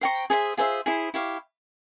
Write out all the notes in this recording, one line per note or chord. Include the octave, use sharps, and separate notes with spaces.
C5 G5 A#5 C#6
G#4 C5 E5
F4 G#4 C5 E5
E4 G#4 C5
E4 G4 C#5 F5